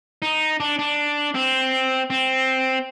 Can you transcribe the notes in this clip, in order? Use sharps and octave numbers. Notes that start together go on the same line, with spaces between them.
D#4
D4
D4
C4
C4